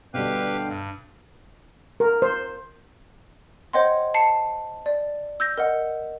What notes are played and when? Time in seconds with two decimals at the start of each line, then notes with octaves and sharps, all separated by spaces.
0.14 B2 D3 G3 D4 G4 B4 F5 G5
0.68 G2
2.00 A#4
2.22 C5
3.73 C5 C#5 D#5 F#5 G5 C6
4.14 A5 C7 C#7
4.86 D5
5.40 E6 G6 A#6
5.57 A#4 D#5 F#5